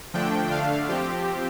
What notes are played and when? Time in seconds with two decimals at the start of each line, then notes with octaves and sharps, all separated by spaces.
0.14 D3 F3 A3 D4 G5
0.51 D3 A3 D4 F5
0.88 F3 C4 G4